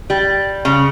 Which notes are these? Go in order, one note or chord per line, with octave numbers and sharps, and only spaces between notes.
G3
C#3